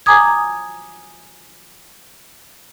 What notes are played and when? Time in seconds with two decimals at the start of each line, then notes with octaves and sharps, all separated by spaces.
0.06 G#5 A#5 D6 D#6 G#6